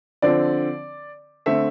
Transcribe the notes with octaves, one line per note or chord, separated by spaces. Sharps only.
D3 F3 C4 D5
D3 A3 C4 E5